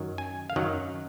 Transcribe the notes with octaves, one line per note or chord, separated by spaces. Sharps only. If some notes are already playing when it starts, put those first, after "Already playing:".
Already playing: F#2 D#3 F#3
G#5
F5
F#2 D#3 F#3 F#5